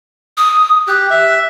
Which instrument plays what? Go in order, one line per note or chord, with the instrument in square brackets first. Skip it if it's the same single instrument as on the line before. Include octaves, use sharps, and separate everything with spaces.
[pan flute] D#6
[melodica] G4 [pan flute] F#6
[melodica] E5